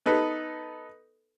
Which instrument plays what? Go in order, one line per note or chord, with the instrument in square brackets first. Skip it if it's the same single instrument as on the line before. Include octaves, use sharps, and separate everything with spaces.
[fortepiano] B3 D#4 A4 B4